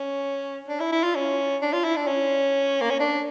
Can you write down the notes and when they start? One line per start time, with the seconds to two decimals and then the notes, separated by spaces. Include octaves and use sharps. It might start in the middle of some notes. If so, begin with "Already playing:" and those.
Already playing: C#4
0.68 D4
0.80 E4
0.92 E4
1.03 F4
1.15 C#4
1.62 D4
1.73 F4
1.84 E4
1.96 D4
2.07 C#4
2.81 A#3
2.90 C#4
3.00 D4